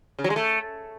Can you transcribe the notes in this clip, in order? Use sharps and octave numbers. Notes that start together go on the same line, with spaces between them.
C#3
F#3
G#3
A3